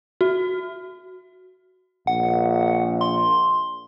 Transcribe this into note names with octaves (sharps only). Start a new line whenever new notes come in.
F#4
A#1 F#5
C6